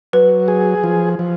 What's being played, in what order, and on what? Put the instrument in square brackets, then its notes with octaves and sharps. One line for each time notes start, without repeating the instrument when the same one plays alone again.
[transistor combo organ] F#3 [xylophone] B4
[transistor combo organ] G#4
F3
F3